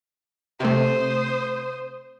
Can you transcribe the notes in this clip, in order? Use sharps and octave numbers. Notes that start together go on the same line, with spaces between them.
C3 A3 C5 D#6